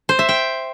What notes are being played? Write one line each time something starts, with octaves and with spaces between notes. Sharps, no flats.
C5
E5
G5